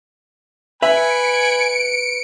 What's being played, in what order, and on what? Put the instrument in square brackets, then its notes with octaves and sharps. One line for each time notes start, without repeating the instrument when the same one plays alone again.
[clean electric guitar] B4 [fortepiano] E5 [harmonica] G#5 B5 [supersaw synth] C#7 D7